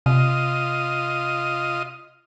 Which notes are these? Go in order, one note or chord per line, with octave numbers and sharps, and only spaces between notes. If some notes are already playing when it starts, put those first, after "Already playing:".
C3 F4 D#5